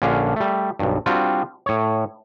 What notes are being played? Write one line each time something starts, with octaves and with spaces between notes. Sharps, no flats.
A#1 D3 C#4 D4 F5
G3 A3
B1 G2
G3 C4 D4 F4 F#4
A2 C#5